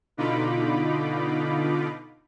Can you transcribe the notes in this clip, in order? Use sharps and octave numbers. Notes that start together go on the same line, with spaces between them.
B2 D3 D#4 F4 B5 D6